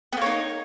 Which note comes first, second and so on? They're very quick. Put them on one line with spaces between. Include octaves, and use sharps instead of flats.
B3 A#3 C#5 D#4